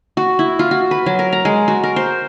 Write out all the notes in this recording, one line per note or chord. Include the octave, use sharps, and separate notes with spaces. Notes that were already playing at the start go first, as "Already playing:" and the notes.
F#4
E4
F4
F#4
B4
F#3
A#4
A#5
G#3
F#4
A#4
C5